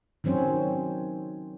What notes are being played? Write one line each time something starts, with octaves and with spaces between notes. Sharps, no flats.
D#3 F#3 C4 C#4 C5